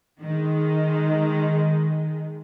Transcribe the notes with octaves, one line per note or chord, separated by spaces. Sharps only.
D#3 G#3